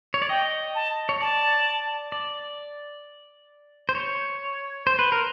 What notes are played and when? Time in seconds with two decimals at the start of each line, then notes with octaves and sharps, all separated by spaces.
0.14 C#5
0.22 D5
0.29 D#5 G5
0.75 A5
1.09 C#5
1.21 D5 A5
2.12 D5
3.89 C5
3.95 C#5
4.86 C5 C6
4.99 B4
5.12 A#4